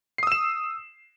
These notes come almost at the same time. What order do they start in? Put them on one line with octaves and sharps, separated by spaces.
C7 D#6 E6 E7